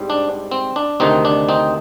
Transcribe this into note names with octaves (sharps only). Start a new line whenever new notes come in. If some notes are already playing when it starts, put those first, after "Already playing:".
Already playing: G#2 G3 C4
D4
C4
D4
D2 C3 D#3 C4 D#4
D4
C4 D#4